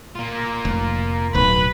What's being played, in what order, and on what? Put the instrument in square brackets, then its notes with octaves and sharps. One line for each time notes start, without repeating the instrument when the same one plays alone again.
[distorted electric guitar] A#3 F4
[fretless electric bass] F1
[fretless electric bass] D1 B1 [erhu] B4